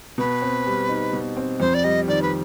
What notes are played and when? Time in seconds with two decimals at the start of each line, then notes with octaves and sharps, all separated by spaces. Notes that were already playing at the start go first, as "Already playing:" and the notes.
0.18 B2 B4
0.42 C4
0.66 G3
0.89 D#4
1.13 B2
1.37 C4
1.60 F2 C5
1.74 D5
1.84 G3 D#5
2.08 D#3 D5
2.22 B4